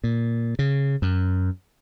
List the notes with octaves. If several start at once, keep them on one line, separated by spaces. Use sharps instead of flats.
A#2
C#3
F#2